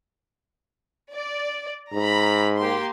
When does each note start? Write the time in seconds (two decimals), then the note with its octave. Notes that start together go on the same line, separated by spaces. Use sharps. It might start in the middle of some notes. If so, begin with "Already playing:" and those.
1.11 D5
1.93 G#2 A#5 B5
2.57 A#3 G4 C6